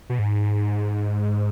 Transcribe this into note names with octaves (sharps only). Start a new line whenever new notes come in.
B2
G#2